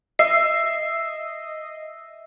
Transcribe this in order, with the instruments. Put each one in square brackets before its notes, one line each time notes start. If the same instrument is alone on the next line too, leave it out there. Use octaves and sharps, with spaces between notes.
[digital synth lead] D#5 [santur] E5 [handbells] C7